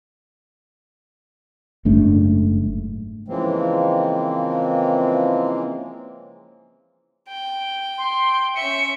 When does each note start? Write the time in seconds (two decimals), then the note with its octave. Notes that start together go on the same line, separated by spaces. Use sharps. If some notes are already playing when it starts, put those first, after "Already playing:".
1.85 F#1 G#2 A3 D4
3.28 C#3 E3 F3 G#3 A#3 C4
7.29 G5
7.98 C6
8.56 C#4 E5 C#7